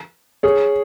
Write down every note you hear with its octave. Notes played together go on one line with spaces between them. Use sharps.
G#4 C#5